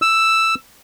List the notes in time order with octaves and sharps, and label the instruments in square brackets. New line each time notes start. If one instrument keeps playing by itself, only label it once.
[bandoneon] E6